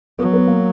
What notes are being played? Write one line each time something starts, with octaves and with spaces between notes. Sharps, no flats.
F#3 B3
B3
A#3